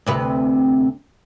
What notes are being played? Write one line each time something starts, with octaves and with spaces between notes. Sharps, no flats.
D2 C3 B4